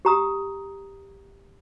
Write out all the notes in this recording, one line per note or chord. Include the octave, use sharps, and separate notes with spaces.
G4 A#5 D#6